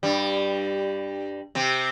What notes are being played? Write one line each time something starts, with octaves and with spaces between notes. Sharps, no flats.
G2 G3
C3 C4